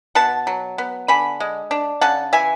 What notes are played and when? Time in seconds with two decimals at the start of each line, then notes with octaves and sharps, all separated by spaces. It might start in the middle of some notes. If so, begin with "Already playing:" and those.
0.15 B2 F#5 A5
0.47 F#3
0.78 B3
1.08 D3 G#5 B5
1.40 G#3
1.71 D4
2.01 C#3 F#5 A5
2.33 E3 E5 G#5